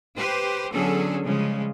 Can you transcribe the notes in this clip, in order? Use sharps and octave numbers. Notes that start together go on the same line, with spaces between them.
G4 B4 C5
D3 F#3 B3 C#4 G#4 A4
C#3 F3 G3 G#3